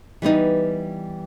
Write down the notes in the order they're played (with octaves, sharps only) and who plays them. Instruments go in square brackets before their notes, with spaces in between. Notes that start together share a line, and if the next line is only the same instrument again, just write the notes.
[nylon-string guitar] E3 G3 B3 D#4